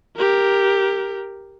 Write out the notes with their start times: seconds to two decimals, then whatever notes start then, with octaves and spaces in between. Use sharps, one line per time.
0.17 G4 A#4